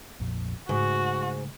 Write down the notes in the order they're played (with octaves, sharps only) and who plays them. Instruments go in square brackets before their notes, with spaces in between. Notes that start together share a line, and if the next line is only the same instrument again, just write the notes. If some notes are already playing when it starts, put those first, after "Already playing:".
[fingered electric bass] A#1 F2 A#2
[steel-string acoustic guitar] G#2 [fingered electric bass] C#3 G#3 A3 [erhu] F#4